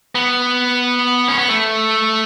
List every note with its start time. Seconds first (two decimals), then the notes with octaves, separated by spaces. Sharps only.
0.15 B3
1.28 C#4
1.38 B3
1.49 A3